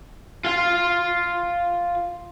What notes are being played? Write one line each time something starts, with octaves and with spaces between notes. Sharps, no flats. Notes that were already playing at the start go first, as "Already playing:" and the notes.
F4 F5